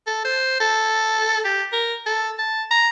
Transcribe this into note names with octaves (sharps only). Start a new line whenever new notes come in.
A4
C5
A4
G4
A#4
A4
A5
A#5